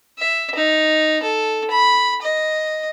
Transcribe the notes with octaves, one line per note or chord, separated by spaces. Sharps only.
E5
D#4
A4
B5
D#5